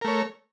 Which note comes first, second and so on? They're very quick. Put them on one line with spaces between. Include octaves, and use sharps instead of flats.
A#4 A3 C#5